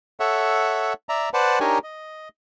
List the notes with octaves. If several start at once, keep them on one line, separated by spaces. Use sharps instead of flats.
A4 C#5 E5 F#5
D5 E5 A#5
B4 C5 D5 F#5 A5
D4 D#4 G4 A#4 C#5 G#5
D#5